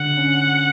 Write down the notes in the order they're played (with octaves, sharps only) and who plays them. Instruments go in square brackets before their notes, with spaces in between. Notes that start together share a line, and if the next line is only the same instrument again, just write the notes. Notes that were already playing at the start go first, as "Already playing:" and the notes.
Already playing: [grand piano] D3 [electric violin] F#5
[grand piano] C#4